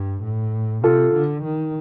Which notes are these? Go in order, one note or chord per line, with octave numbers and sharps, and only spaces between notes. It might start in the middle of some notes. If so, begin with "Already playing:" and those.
Already playing: G2
A2
C3 F4 A4
D3
D#3